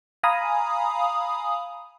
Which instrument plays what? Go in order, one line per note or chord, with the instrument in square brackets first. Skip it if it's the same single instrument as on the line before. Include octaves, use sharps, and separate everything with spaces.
[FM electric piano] F5 G#5 A#5 B5 D#6